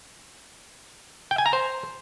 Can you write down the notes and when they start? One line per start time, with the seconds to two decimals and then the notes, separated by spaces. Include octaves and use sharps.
1.31 G5
1.38 G#5
1.46 A#5
1.53 C5